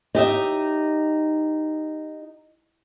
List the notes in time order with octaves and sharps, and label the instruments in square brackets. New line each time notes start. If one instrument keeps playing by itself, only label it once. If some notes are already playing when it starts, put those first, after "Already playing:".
[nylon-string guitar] D#4 G4 D#5 E5